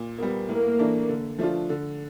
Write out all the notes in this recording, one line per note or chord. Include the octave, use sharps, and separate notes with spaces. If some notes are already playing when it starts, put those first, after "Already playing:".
Already playing: A#2
G3 A#3 B3
A2 A#3
E3 A3 D4
D3
F3 A3 D4 F4
D3